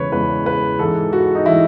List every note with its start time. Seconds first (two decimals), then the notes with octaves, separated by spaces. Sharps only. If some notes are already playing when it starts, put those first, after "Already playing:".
Already playing: E2 C#3 E3 G#3 B4 C#5
0.12 E2 C#3 E3 G#3 B4
0.46 B4
0.79 G#2 E3 G#3 A4
1.13 F#4
1.35 D#4
1.46 E3 G#3 E4